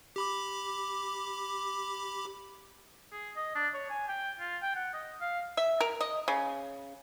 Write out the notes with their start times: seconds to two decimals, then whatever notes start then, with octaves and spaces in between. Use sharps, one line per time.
0.16 G4 B5 D6
3.12 G#4
3.36 D#5
3.55 D4
3.74 C#5
3.90 G#5
4.08 G5
4.40 F4
4.62 G5
4.75 F#5
4.94 D#5
5.21 F5
5.57 E5
5.81 A#4
6.01 D#5
6.28 C#3